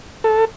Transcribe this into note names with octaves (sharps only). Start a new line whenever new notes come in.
A4